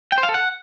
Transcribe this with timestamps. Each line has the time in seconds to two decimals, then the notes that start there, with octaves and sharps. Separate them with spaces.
0.12 G5
0.18 C5
0.23 F5
0.29 A4
0.34 F#5